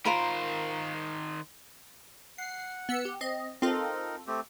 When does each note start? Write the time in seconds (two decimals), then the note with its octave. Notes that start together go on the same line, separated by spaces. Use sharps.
0.05 D#3 F4 A#4 C5 B5
2.38 F#5 C7
2.89 B3 E6 C#7
3.05 G4
3.21 C4 D#5
3.62 C4 D#4 F4 A4 A#4
4.27 A3 C4 G4